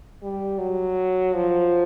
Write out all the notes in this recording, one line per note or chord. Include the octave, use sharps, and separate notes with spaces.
G3
F#3
F3